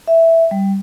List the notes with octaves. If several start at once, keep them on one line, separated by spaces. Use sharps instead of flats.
E5
G3